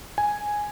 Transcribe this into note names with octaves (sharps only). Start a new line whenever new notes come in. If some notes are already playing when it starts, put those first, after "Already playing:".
G#5